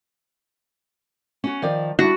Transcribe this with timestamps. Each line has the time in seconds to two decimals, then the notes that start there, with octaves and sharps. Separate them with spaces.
1.44 C#4 F#4
1.62 D#3 F3 D5
1.99 G3 D4 E4 F#4